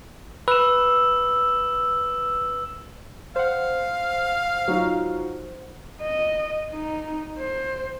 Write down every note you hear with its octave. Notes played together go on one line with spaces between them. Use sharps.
B4 E6 E7
C5 F5 F#5
F#3 D#4 F4
D#5
D#4
C5